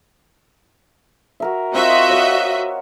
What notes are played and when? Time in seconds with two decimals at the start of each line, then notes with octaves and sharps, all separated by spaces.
1.40 F#4 A#4 E5
1.74 C4 F4 F#4 D#5 E5
2.10 C#5 F#5